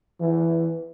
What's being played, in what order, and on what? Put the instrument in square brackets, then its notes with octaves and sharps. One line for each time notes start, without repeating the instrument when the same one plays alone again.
[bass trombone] E3